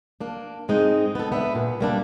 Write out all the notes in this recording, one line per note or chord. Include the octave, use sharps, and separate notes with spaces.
A#3 D4
G#2 G#3 C4 D#4
B3 A4
B3 D4 E5
A#2
G3 A#3 D4